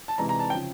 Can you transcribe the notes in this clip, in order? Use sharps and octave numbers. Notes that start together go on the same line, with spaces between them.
A5
C3 E3 G#3 A#5
A#5
A5
C#3 F3 G5